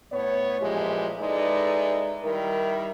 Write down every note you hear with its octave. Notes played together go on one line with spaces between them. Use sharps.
A2 B3 C#5
F#2 A#2 E3 F3 G#3 G4
G#3 D#4 E4 A4 B4 D5
D#3 G3 E4 A#4